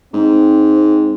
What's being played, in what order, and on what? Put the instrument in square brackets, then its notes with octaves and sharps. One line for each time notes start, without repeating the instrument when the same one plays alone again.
[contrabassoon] G#2 [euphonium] C4